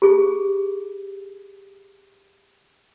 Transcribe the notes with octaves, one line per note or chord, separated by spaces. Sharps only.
G4 G#4